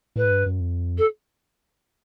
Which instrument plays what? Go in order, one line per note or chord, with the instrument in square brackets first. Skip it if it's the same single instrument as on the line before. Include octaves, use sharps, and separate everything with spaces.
[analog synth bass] A2 [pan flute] B4
[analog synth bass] G#2
G2
F#2
F2
[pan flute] A4